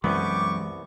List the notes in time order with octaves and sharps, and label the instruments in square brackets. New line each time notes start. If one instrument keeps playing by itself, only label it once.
[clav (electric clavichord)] C2 B3 [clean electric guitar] F#2 [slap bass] E3 G#3 [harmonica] G4 C#6 D6